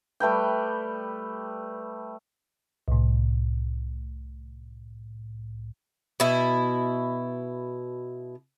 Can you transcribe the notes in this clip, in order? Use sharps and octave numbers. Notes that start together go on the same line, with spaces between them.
G3 A3 B4 G5
C2 A2
B2 E4